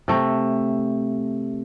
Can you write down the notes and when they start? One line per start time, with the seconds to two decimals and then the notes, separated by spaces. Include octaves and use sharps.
0.08 C3 A3